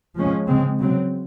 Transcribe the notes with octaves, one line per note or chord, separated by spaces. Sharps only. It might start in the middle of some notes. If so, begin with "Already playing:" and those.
F3 G#3 C#4
C#3 G#3 C4
C#3 F#3 C4